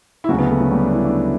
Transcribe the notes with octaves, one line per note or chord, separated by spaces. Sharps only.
E4
D2 C#3 F#3 F#4
B3
A3
F#3
G3
D4
E4
D4